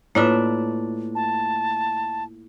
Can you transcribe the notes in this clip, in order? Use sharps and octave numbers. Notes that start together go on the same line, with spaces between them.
A2 A#3 D4 F4 B4 E5
A5